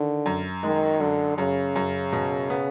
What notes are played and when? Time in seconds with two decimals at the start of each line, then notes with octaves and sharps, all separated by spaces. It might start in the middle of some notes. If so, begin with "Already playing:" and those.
Already playing: D3 D#3
0.26 F#2
0.63 D#3 G#3
1.00 F#2 D3
1.38 F#2 C#3
1.76 F#2
2.13 B2
2.50 B3